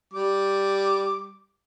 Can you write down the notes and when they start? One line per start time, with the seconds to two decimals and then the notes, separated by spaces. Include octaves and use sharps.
0.13 G3 D6